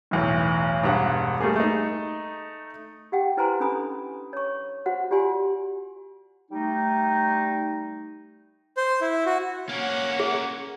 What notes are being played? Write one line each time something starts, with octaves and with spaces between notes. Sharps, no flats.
B1 E2 A2
E1 G2 F#5
G3 A3 A#3 G#4
A3 D#4
G4 F#5 G5
E4 B4 C5 G#5 A#5 C6
C#4 D4 A4 G#5 B5 D#6
C#5 C#6
F#4 C5 F#5
F4 G4 D5 G#5 C6
G3 A3 D#4
C5
E4
F#4
A#3 C#4 C#5 F#5
G#4